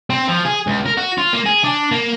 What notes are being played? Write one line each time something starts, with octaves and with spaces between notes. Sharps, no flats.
C4
F3
G#4
C#2
A#4
F#4
F4
A#3
G#4
D4
A#3